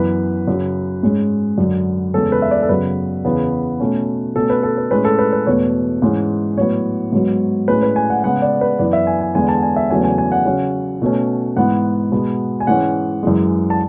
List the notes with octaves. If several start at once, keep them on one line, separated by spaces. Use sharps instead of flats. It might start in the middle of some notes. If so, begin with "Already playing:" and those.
Already playing: F#2 E3 B3 B4
F#2 C#3 F#3
G#2 G#3 C#4
F#2 D3 F#3
E2 C#3 G#3 C#4 A4
B4
E5
D5
A4
F#2 C#3 F#3 B3 B4
E2 C#3 E3 B3
B2 A3 C#4
B2 A3 C#4 A4
B4
A4
B4
A2 G#3 C#4 B4
A4
B4
B4
E2 B2 A3 C#5
G#2 E3 G#3 C#4
A2 F#3 B3 C#5
G#2 F#3 B3
A2 G#3 C#4 B4
B4
G#5
F#5
C#3 G#3 B3 F#5
D5
B4
F#2 E3 B3 D5
E5
G#5
G#5
E2 D3 G#3 B3 G#5
A5
G#5
E5
E2 C#3 F#3 A3 C#4 G#5
G#5
G#5
F#5
C#3 F#3 C#4
B2 A3 C#4
G#2 E3 B3 F#5
B2 G#3 B3
G#5
G#2 E3 G#3 C#4 F#5
F#2 E3 G#3
A5